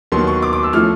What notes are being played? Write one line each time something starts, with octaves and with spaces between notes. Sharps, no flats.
D#2 D#3 F#3 B3 C6
C#6
D6
D6
E6
F3 A3 C#4 F6